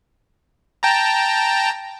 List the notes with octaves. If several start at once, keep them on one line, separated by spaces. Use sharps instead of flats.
G5 A5 A#5